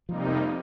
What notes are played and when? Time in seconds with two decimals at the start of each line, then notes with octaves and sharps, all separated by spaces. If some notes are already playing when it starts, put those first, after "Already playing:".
0.08 F2 C3 F3 G3 A#3 D#4
0.29 C4